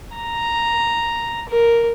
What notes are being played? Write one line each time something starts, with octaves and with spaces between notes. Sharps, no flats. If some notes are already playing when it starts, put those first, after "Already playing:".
A#5
A#4